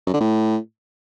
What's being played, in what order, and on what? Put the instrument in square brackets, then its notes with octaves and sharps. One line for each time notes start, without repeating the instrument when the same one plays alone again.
[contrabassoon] F#2
D3
A2